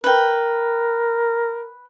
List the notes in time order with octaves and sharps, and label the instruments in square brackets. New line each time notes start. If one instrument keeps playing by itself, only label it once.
[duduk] A#4 [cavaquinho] B4 G5